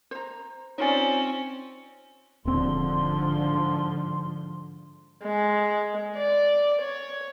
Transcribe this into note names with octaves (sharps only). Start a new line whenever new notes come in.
C5 A#5
C4 C#4 D#4 F4 C#5 D5 G#5
D#1 G#2 D3 F3 C4 C6
G#3
D5
C#5